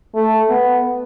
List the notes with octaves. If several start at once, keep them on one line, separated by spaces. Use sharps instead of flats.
A3
B3